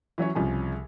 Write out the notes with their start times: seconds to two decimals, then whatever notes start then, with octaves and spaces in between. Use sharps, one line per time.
0.18 E3 F#3 C#4 C#5
0.35 C2 C#3 F3 G#5